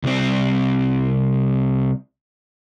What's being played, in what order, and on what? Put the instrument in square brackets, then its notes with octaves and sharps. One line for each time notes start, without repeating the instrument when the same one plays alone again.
[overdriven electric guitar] C2 C4